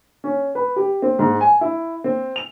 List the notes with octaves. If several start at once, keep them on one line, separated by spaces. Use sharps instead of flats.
C#4
B4
G4
C4
G#2
G#5
E4
C4
F7